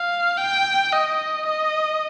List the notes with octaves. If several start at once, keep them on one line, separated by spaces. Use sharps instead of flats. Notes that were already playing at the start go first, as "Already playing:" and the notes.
Already playing: F5
G5
D#5
D#5